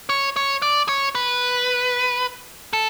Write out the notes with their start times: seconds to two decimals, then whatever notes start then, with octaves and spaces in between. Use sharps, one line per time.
0.09 C#5
0.36 C#5
0.62 D5
0.89 C#5
1.15 B4
2.73 A4